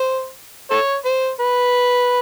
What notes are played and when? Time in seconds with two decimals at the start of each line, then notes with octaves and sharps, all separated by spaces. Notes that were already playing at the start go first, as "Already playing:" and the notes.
Already playing: C5
0.71 A4 C#5
1.05 C5
1.40 B4